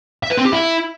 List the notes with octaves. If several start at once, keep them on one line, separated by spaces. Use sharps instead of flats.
E5
B4
C4
G4
E4